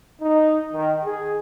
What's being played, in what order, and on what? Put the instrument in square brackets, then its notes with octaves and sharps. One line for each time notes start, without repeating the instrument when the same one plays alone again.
[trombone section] D#4
D#3
G#4